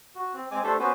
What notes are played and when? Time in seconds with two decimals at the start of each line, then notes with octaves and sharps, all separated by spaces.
0.15 F#4
0.34 C4
0.51 G#3 C4 G#5 D6
0.64 A3 D4 G4 A4 C5
0.79 B3 C#4 F#4 B4 C5